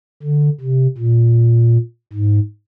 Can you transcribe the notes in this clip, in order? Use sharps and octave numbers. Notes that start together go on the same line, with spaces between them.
D3
C3
A#2
G#2